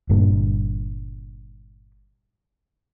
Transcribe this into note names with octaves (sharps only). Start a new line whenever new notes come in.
G1 G2 A#2